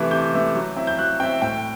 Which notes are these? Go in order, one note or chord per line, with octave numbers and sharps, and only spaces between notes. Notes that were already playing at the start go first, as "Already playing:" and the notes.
Already playing: C3 E3 A3 E4
C3 G6
E3 A3 E4
F#3
C4 E4
G6
F#3 F#6
C4 E4 G5
A2 G5